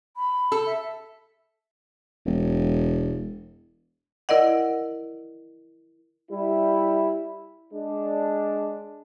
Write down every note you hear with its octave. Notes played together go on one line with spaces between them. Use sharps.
B5
A4
E5
E1
E4 A#4 D5 D#5 F#5
G3 E4
G#3 D4